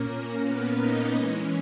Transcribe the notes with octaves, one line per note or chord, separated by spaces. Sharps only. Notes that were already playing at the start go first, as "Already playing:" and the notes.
Already playing: A#2 A#3 C#4 A#4
B3 B4
D#4 D#5
E3 G#3 C#4